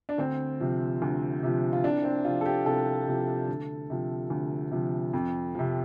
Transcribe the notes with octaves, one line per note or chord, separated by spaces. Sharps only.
D4
D2 C4
C3 F3
D2
C3 F3
F4
C2 D4
C4
C3 F3 F4
A4
G4
C2 A4
C3 F3
D2
C3 F3
D2
C3 F3
F2
C3 F3